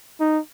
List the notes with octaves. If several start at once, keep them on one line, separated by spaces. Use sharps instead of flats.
D#4